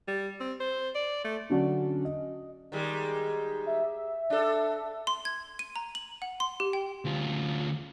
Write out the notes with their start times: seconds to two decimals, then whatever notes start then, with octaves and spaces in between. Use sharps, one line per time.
0.08 G3
0.40 C4
0.60 C5
0.95 D5
1.24 A3
1.50 D3 F#3 C#4 D4 F#4 D5
2.05 D#5
2.72 D#3 G3 G#3
3.67 E5
4.30 D4 A4
5.07 C6
5.25 G#6
5.59 D#7
5.76 A#5
5.95 F#7
6.22 F#5
6.40 C6
6.60 G4
6.73 G5
7.05 D2 F4